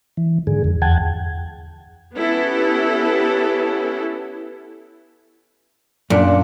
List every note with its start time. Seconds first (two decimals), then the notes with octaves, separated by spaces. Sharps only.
0.17 E3
0.47 G#2 D3 G#4
0.64 F2
0.82 E2 F#5 G5 A5 G#6
2.16 B3 C#4 E4 G4 A4
6.10 F#2 A#2 D4